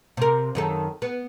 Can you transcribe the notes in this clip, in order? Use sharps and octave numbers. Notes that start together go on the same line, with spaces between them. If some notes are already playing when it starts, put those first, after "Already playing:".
C3 A#4
F#2 D#3 A4
B3